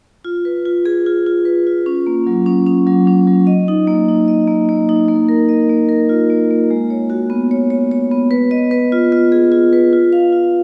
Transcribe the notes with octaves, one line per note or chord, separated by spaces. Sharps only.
F4
B4
F4
G#4
F4
F4
B4
F4
C#4
A#3
F#3
C#4
C#4
F#3
C#4
F#3
D#5
D#4
A#3
D#4
D#5
A#3
A#3
D#4
A#3
A#4
D#5
A#3
A#4
F4
A#3
A#3
G#3
C#5
F#4
B3
C#5
C#5
C#5
B3
B4
D#5
B4
F4
F4
G#4
F4
B4
F4
F5
F4